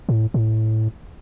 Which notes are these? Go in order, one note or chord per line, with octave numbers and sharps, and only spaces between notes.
A2
A2